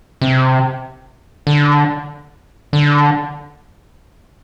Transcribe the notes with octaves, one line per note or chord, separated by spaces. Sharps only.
C3
D3
D3